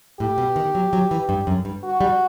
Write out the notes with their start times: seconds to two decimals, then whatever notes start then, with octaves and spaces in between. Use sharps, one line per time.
0.20 A2 G4
0.38 B2
0.56 D#3
0.75 F#3
0.93 F#3
1.11 E3
1.29 G2
1.47 F#2
1.65 G2
1.83 F#4
2.01 G3